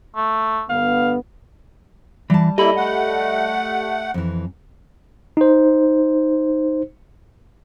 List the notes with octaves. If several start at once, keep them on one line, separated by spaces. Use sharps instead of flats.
A3
G2 D3 B3 F5
E3 G3 A5
A#3 E4 G4 A4 D5 D#5 B5
A3 F#5
F2 E3
D#4 C5